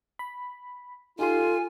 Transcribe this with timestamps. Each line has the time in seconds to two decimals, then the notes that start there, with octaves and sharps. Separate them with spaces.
0.19 B5
1.19 D#4 F4 G4 A4 G#5 C6